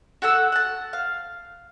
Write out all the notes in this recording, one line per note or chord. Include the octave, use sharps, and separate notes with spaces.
F#4 A4 F#5 E6
F#5 A5
F5